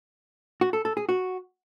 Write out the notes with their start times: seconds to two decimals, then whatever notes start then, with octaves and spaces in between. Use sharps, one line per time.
0.61 F#4
0.73 A4
0.85 A4
0.97 G#4
1.09 F#4